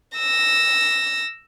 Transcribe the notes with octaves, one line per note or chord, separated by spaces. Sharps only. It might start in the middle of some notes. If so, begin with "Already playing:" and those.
E6 A#6